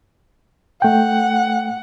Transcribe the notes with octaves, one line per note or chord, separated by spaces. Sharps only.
A3 F#5 G5